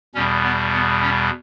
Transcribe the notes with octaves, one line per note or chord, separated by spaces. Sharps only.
E2 B2 G3 C#4
B3
B3
C#4